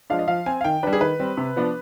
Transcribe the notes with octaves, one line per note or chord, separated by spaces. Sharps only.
F3 G#3 D4 F5
D#5
F3 F5
C4 G#5
F5
D#3 G5
G3 D4 B4
G#4
D#3 B4
G3 C4
C3
F3 B3 D4